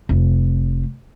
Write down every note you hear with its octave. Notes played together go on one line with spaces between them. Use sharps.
F1